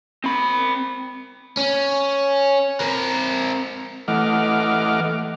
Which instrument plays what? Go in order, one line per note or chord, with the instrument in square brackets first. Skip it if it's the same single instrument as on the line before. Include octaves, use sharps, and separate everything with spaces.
[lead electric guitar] C4 B5
[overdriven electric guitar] C#4
C4 A#4
[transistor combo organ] E3 A3 D#5 F#5 D6 F6